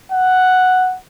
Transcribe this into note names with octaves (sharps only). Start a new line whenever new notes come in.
F#5